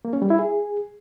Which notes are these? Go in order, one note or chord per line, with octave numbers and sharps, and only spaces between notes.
A#3
C#4
G3
E4
G#4